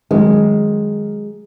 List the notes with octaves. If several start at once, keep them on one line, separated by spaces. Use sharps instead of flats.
F#2 D#3 G#3